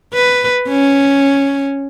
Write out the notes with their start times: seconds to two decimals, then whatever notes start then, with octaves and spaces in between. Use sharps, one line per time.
0.13 B4
0.68 C#4